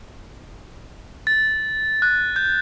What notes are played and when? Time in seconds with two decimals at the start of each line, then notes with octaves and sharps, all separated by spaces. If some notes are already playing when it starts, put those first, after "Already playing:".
1.27 A6
2.02 F#6
2.36 G6